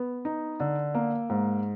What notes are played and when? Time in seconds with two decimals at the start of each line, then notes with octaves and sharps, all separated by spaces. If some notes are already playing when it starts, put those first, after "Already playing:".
Already playing: B3
0.25 D#4
0.60 D3
0.94 A#3
1.30 G#2